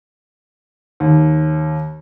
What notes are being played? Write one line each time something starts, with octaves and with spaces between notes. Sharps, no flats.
D#2